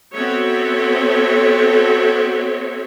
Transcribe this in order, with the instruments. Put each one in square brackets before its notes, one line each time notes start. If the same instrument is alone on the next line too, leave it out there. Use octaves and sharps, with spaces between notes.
[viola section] B3 C4 F#4 A4 C#5 E5